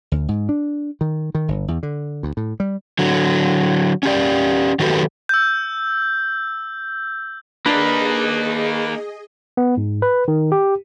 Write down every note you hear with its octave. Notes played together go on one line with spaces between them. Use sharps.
D2
G#2
D4
D#3
D#3
G1
E2
D3
D2
A2
G3
D3 F#3
C#4 G4 D5
D#3 F#3 F#4 G4 A4 B4
E6 G6
A#3 D4 D#4 G#4 B4 D#5
B3
G#2
B4
D#3
G4